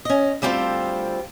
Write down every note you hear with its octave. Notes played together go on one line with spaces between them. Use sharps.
C#4 D#5
D2 G3 C4 F4 A4 C5